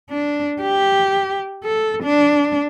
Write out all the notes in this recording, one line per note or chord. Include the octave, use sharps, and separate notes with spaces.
D4
G4
A4
D4